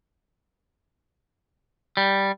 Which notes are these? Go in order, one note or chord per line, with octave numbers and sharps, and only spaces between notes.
G3